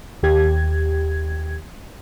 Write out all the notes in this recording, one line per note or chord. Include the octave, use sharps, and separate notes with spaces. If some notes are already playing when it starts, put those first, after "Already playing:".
D#2 G4 G#6